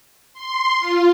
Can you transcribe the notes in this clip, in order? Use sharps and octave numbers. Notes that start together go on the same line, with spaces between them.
C6
F4